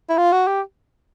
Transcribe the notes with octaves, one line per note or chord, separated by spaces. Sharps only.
E4
F4
F#4
G4